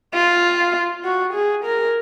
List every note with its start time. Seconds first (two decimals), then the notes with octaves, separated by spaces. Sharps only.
0.14 F4
1.05 F#4
1.34 G#4
1.65 A#4